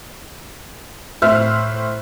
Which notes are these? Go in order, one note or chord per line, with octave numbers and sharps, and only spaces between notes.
A2 C5 E5 F6 F#6